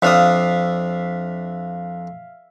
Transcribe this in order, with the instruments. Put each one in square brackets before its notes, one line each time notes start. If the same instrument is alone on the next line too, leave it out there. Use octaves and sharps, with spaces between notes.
[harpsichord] F2 D4 D#6 [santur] E5 F5